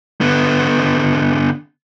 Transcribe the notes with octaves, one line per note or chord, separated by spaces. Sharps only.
D3 B3